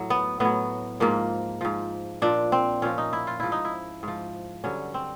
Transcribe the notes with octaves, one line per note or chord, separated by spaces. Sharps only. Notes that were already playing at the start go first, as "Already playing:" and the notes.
Already playing: A2 F#3
B3
A2 F#3 B3
G#2 F3 A#3
G#2 F3
A#2 F3 D4
C4
A#2 F3 C#4
D#4
E4
F4
G#2 F3 E4
D#4
E4
G#2 F3
G2 D3 F#3 C#4
C4